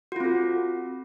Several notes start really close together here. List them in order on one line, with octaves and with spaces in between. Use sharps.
F#4 F4 C4 A4